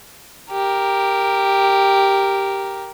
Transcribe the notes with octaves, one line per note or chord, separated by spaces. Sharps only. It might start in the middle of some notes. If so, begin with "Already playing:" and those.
G4 A#4